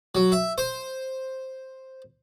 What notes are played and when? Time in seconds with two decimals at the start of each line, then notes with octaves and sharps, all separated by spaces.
0.15 F#3
0.32 E5
0.58 C5